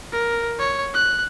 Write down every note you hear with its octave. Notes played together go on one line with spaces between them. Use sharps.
A#4
C#5
F#6